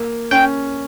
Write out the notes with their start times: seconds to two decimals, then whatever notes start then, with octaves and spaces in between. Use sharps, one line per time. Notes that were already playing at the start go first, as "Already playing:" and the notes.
Already playing: A#3
0.31 C#4 G5